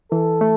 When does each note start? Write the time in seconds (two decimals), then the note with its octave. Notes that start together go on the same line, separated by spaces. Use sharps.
0.12 E3 A4
0.41 A3